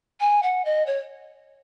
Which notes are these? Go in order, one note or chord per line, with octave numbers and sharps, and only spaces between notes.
G#5
F#5
D#5
C#5